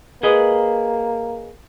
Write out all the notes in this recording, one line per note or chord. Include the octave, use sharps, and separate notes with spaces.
A#3 G#4 B4 D#5